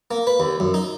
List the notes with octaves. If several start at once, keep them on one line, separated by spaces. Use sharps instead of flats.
A#3
B4
D#2
F#2
D#4